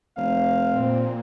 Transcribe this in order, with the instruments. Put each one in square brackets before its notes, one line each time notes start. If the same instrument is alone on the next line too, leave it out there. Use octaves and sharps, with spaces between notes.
[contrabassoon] F1 [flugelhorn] F5
[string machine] A#2 [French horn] C4